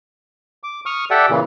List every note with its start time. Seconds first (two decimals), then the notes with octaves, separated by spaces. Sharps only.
0.63 D6
0.86 C#6 D#6 F6
1.11 G4 A4 D5 E5 F#5 G5
1.30 A#2 C#3 E3